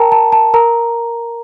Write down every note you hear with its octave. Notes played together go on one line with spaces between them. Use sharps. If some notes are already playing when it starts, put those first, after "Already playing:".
Already playing: A#4 G5 A5 A#5
A5
A5
A#4 A#5